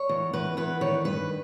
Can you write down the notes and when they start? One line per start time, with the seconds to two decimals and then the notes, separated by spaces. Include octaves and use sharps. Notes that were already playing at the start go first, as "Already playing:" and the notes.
Already playing: C#5
0.09 E2
0.33 E2 B4
0.57 E2 B4
0.81 D#3 C#5
1.05 G2 B4